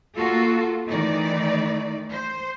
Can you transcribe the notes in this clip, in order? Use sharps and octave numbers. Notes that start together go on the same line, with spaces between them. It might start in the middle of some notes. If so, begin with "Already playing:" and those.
A#3 F4 F#4 A4
D#3 E3 A3 D#4 D5
C5